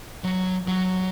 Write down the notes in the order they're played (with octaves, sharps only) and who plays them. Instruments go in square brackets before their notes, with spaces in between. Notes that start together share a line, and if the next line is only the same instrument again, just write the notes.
[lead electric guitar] F#3
F#3